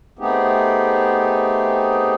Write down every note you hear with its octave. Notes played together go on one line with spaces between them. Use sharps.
A3 B3 C4 D#4 G4 G#4